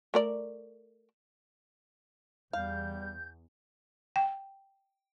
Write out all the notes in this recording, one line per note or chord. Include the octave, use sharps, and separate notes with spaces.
A3 A#4 D5
E2 G3 F5 G6
G5